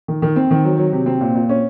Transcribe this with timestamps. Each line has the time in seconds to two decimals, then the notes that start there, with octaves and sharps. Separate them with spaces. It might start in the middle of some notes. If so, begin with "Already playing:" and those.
0.08 D#3
0.22 D#3
0.36 C4
0.51 D#3
0.64 F#3
0.78 F#3
0.93 C3
1.06 C4
1.21 A#2
1.35 A#2
1.49 C#4